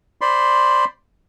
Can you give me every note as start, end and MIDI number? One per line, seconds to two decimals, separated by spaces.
0.21 0.85 72
0.21 0.85 74
0.21 0.85 83
0.21 0.85 84